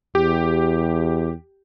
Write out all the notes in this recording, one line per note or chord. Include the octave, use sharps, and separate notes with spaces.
E2 G4